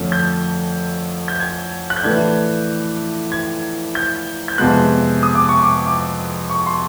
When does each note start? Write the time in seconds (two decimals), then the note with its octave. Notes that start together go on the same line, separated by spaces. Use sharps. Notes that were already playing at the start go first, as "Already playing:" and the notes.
Already playing: F2 D3 F3 A3 C#4
0.12 G6
1.28 G6
1.40 G#6
1.90 F#6
1.96 G6
2.03 A2 E3 A3 D4 G#6
3.32 G#6
3.95 G6
4.48 G6
4.58 F2 C3 F3 G#3 B3 F#6
5.23 D#6
5.35 D6
5.49 C#6
5.63 D6
5.87 D6
6.50 C#6
6.67 C6